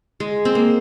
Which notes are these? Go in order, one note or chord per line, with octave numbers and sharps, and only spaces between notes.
G#3
C4
A#3